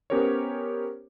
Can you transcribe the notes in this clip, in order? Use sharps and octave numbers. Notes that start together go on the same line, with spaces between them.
B3 C#4 G4 A#4 C5 C#5